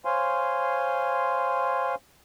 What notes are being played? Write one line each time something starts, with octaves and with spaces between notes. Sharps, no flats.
C5 C#5 F5 G#5 C6